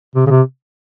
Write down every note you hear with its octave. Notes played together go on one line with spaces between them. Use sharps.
C3
C#3
C3